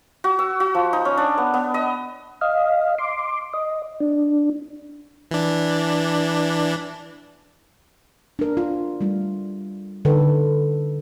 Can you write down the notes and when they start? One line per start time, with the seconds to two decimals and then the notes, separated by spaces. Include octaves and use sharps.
0.24 F#4
0.39 E6
0.60 F#4
0.75 F3
0.93 D#4
1.05 C#4
1.17 D4
1.38 B3
1.54 B3
1.74 D#5
2.41 D#5 F5
2.98 C6 D6
3.53 D#5
4.00 D4
5.31 E3 D4
8.39 D4 A#4
8.57 F4
9.01 G3 A3 F4
10.05 D3 D#4 A4 B4